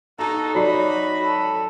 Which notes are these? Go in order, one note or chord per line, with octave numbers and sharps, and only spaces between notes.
D#4 F#4 A4 A#5
F#3 C#5 D5 B5 C7
A4